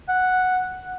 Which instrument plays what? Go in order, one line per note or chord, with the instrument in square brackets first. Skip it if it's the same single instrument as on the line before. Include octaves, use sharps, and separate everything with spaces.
[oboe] F#5